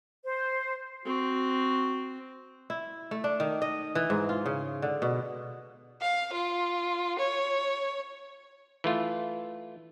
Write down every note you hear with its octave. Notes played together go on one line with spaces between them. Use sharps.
C5
C4 F#4
E4
A3
D4
D#3
D#5
E3
G#2
F4
C#3
D3
B2
F5
F4
C#5
E3 A3 F4